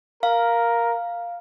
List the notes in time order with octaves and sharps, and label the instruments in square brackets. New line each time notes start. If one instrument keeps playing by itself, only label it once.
[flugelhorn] A#4 [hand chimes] F5